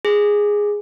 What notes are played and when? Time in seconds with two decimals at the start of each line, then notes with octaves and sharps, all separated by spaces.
0.05 G#4